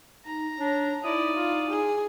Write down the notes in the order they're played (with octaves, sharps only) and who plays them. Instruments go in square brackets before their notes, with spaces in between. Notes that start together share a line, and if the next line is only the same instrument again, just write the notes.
[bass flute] D#4 [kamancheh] A#5
[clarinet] D4 [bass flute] C#5
[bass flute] D#4 [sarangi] E4 [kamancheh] D5 [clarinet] D#6
[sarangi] F4
G#4